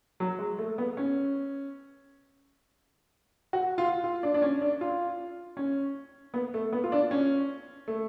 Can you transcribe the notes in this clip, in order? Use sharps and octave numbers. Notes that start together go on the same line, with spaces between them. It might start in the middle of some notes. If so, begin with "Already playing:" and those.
F#3
G#3
A3
B3
C#4
F#4
F4
F4
D4
D4
C#4
D4
F4
C#4
B3
A3
B3
F4
D4
C#4
A3